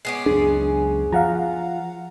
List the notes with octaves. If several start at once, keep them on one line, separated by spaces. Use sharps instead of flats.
G#3 B3 C#4 D6 C7
C#2 F#2 D4 G#4
F3 F5 F#5 A#5